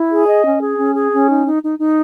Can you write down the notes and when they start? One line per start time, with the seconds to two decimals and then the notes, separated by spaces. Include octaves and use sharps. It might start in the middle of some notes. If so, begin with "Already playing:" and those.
Already playing: E4
0.10 G#4
0.26 D#5
0.44 C#4
0.60 G#4
0.78 C#4
0.95 G#4
1.11 C#4
1.29 D#4
1.45 D#4
1.62 D#4
1.79 D#4